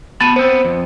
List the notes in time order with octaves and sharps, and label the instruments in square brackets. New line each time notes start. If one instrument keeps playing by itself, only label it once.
[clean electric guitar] B3 A5 B5 [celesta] A6 D#7
[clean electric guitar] B3 C4 [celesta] C5
[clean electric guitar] F2